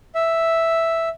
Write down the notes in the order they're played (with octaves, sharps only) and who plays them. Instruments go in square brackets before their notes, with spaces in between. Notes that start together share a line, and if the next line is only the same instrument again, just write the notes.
[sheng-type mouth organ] E5